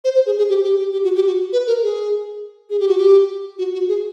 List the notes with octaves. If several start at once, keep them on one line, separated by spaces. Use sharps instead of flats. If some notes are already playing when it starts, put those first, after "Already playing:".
C5
C5
G#4
G#4
G4
G4
G4
G4
F#4
G4
F#4
B4
A#4
G#4
G#4
G4
F#4
G4
F#4
F#4
G#4